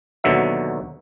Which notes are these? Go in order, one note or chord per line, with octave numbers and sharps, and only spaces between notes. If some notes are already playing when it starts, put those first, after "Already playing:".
D#2 B2 D3 F#3 E5